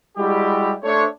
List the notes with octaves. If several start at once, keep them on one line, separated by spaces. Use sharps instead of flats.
G3 G#3 E4 F#4 G4
A3 D4 C5 C#5